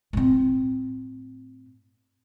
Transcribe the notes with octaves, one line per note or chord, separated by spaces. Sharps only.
A2 C4